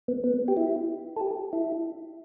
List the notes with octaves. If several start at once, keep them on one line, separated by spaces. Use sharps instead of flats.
B3
B3
G4
E4
A4
G4
E4